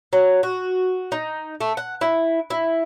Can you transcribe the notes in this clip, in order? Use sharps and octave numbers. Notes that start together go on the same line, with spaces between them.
F#3
F#4
D#4
A3
F#5
E4
E4